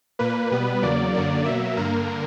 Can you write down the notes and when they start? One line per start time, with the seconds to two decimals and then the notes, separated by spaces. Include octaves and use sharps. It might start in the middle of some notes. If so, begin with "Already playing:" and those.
0.19 A#2 A#3 B4
0.51 B2 G3 B3
0.82 E2 C#3 F#3 A#3 D5
1.14 F#2 D3 F#3 A#3
1.45 B2 F#3 A#3 E5
1.77 G2 D3 A#3 A#4